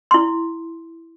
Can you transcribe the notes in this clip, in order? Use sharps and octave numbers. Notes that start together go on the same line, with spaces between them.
E4 C6